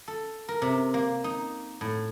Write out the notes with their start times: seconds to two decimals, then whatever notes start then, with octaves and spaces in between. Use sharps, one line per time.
0.08 A4
0.48 A#4
0.62 C3
0.94 A#3
1.24 D#4
1.81 A2